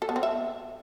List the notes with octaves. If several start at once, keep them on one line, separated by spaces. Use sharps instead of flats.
A4
B3
C4
E5